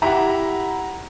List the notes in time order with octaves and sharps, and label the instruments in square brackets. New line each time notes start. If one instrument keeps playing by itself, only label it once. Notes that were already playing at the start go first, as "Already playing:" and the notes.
[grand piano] E4 G4 [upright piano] F#5 A#5